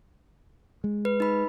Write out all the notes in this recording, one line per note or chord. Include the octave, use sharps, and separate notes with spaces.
G#3
B4
D#4 B5